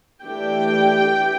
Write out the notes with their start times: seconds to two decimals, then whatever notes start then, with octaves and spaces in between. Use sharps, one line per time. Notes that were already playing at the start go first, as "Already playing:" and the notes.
0.23 E3 A3 D4 G4 G5